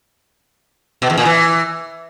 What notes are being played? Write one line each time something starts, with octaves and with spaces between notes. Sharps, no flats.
B2
E2
A#2
E3